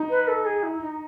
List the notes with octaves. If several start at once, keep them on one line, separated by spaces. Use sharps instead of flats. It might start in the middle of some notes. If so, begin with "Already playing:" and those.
Already playing: D#4
B4
A4
G#4
E4
D#4